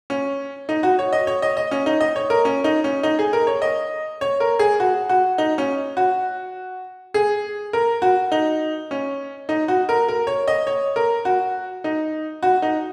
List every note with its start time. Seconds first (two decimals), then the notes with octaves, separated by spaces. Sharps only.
0.10 C#4
0.69 D#4
0.83 F#4
0.99 C#5
1.13 D#5
1.27 C#5
1.42 D#5
1.57 D#5
1.71 C#4
1.86 D#4
2.01 D#5
2.16 C#5
2.30 A#4
2.45 C#4
2.64 D#4
2.84 C#4
3.03 D#4
3.19 G#4
3.33 A#4
3.47 C#5
3.62 D#5
4.21 C#5
4.40 A#4
4.59 G#4
4.80 F#4
5.09 F#4
5.38 D#4
5.58 C#4
5.97 F#4
7.14 G#4
7.73 A#4
8.02 F#4
8.32 D#4
8.91 C#4
9.49 D#4
9.68 F#4
9.89 A#4
10.08 A#4
10.27 C#5
10.48 D#5
10.67 C#5
10.96 A#4
11.25 F#4
11.84 D#4
12.43 F#4
12.62 D#4